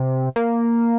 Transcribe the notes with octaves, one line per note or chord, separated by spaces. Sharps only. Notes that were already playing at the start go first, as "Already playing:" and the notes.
Already playing: C3
A#3